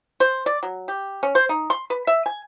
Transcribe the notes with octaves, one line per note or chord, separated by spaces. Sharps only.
C5
D5
F#3
G4
C#4
C5
D#4
C6
B4
E5
G#5